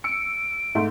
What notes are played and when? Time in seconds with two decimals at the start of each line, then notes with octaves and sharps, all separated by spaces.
0.04 E6 C#7 D7
0.75 G#2 A3